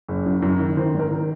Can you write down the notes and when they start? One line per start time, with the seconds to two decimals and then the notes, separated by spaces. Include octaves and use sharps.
0.08 F#1
0.26 F#2
0.42 F#2
0.59 D#3
0.77 D#3 C5
0.94 G#1
0.99 A#4
1.11 D#3